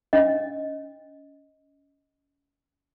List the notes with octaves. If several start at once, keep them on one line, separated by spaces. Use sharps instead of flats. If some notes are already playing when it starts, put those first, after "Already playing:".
C#4 D#5